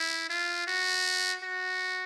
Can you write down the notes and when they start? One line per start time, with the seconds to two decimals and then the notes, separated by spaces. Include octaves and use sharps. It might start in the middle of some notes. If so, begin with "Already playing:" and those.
Already playing: E4
0.29 F4
0.67 F#4
1.43 F#4